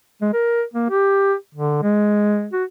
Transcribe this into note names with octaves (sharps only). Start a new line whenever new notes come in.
G#3
A#4
A#3
G4
D3
G#3
F#4